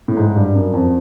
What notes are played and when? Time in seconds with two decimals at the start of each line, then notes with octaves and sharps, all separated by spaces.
0.08 A2
0.17 G#2
0.36 G2
0.55 F#2
0.73 F2